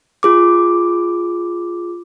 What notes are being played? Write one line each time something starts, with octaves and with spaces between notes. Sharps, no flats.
F4 G#4 D6